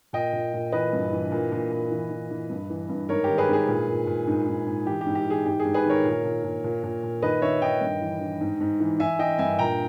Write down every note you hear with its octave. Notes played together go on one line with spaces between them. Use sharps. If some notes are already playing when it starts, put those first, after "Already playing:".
A#2 D#5 G5
A#2
A#2
E3 B4 D#5
G2
E3
A#2
A#2
A#2
E3
E3
E3
G2
E3
G2
G#2 A#4 C#5
D#3 G4 A#4
G#4 B4
G#2 G#4 B4
A#2
A#2
A#2
G#2
G#2
G#2
E3 G4
G4
G#2
G4
E3 G#4
G#2 G4
G#4
G#2
G#4 B4
D#3 A#4 C#5
A#2
A#2
A#2
A#2
A#2
A#2
D#3 B4 D#5
D#3 C#5 E5
D#3 D#5 G5
G2
E3
E3
G#2
G#2
E3
E3 E5 G#5
E3 D#5 G5
G2 E5 G#5
A#2 G5 A#5